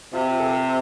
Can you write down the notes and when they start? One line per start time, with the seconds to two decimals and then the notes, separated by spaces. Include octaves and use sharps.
0.13 C3 F4 G4
0.39 G4 A4